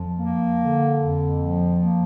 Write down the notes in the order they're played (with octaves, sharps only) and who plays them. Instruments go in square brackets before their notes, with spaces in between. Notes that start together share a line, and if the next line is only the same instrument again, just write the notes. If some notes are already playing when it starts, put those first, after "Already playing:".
Already playing: [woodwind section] F2 F3
A#3
D3
F2
F3
A#3